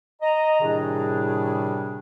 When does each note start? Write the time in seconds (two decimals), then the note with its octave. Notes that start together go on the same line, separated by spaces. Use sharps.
0.22 D#5 A#5
0.60 A2 C3 D#3 G3 D4 G#4